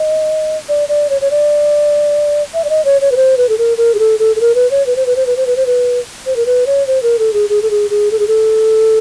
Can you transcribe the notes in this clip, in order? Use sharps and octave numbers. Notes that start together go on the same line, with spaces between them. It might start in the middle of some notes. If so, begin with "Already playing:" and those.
Already playing: D#5
D5
D5
C#5
C#5
D5
E5
D5
D#5
C#5
C#5
B4
C5
B4
A4
A#4
A#4
G#4
A4
A4
A4
A#4
B4
C#5
B4
C5
B4
C5
B4
C5
B4
C5
B4
C5
A#4
B4
C#5
C5
A#4
A4
G#4
G#4
A4
G#4
G#4
A4
G#4
A4